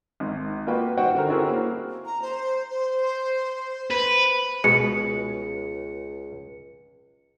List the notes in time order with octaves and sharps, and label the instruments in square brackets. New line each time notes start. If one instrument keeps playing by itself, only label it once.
[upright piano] G#1
A#3 F4 F#4 B4 G5
G3 D#4 F#4 C5 F#5 G5
D3 A#4
C4 C#4 E4 F#4 G#4 A#4
A#3
[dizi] A#5
C5
C5
[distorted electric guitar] B4
[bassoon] C#2 [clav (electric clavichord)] B2 G#3 [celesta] C#7